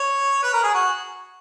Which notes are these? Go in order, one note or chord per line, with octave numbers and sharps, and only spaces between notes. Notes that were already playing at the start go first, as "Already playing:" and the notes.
Already playing: C#5
B4
A#4
G#4
F#4